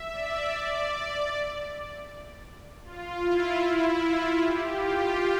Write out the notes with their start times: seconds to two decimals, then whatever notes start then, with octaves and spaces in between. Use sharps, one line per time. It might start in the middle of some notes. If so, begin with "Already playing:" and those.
Already playing: E5
0.12 D5
2.84 F4
3.23 E4
3.99 F4
4.39 G4
4.78 F4